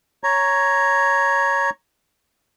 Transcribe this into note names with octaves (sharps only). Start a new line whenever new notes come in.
C#5 A#5